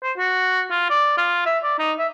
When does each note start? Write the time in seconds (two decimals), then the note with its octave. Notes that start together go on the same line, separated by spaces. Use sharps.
0.03 C5
0.18 F#4
0.71 F4
0.90 D5
1.18 F4
1.46 E5
1.64 D5
1.79 D#4
1.99 E5